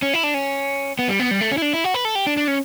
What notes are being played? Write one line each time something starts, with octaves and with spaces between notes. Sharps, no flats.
C#4
E4
D4
C#4
B3
G3
B3
G3
A3
C#4
E4
D4
E4
F#4
B4
A4
G4
D4
D4
C#4